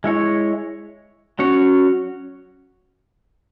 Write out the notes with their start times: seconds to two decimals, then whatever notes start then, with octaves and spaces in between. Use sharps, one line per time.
0.04 G#3 E4 C#5
1.39 F#3 C#4 F#4 C#5